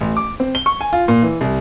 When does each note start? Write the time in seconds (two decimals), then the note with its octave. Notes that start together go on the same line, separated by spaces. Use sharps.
0.01 A1
0.17 D6
0.40 C4
0.55 G7
0.66 C#6
0.81 G#5
0.93 F4
1.08 A#2
1.22 E3
1.41 C2